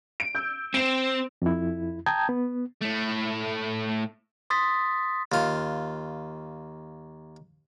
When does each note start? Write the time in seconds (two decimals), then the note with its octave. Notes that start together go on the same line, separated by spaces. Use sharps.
0.20 D7
0.35 E6 G6
0.74 C4 D7 E7
1.42 F2 E4
2.06 G5 A5 A#5 D#6 G6 G#6
2.29 B3
2.82 A2 A3
4.50 C6 D#6 A6 B6
5.32 D#2 F4